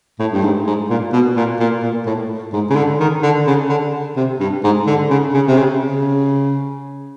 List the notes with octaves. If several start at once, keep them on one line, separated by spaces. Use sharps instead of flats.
A2
G2
G#2
G#2
A#2
B2
A#2
A#2
A#2
A2
G#2
C#3
D3
D#3
D3
C#3
D3
C3
G2
G#2
D3
C#3
C#3
C3
C#3
C#3